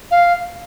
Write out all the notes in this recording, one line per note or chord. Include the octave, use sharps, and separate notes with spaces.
F5